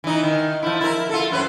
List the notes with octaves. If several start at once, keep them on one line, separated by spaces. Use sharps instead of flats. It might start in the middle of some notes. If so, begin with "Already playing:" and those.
E3 D#4
D#3
F3 E4
E4 A#4
F4 A4
F#2 B4 C5